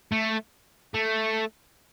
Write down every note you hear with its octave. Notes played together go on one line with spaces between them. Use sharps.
A3
A3